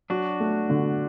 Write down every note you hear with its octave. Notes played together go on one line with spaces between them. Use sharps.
F#3 D4 F#4
A3
D3